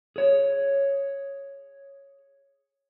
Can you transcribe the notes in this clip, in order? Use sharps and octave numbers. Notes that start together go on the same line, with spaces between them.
G#4 C#5